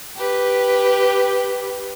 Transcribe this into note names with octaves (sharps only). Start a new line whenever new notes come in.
G4 B4